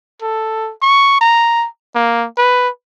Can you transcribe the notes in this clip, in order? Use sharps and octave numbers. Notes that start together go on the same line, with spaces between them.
A4
C#6
A#5
A#3
B4